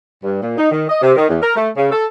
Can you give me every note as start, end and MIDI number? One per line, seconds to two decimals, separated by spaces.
0.23 0.40 43
0.42 0.56 46
0.57 0.68 63
0.71 0.84 51
0.89 0.99 75
1.02 1.13 48
1.16 1.28 51
1.29 1.37 40
1.41 1.53 70
1.56 1.70 57
1.76 1.88 49
1.91 2.05 69